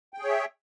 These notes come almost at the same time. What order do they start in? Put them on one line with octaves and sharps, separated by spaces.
G5 G#4 C#5 E5